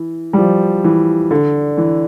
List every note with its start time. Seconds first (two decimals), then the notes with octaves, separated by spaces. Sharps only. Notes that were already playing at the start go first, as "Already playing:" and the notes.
Already playing: E3
0.33 G3
0.38 F3
0.84 E3
1.31 D3
1.78 E3